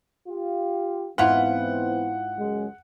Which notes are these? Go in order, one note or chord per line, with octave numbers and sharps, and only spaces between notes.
F4 G4
G#2 E3 B3 C4 E4 F4 F#5
C#2 F#2 G#3